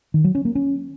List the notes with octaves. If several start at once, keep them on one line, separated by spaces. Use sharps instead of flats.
D#3
F#3
C#4
A#3
C#4